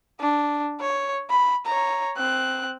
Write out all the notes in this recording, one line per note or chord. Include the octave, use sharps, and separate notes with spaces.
D4
C#5
B5
C#5 A#5
C4 F#6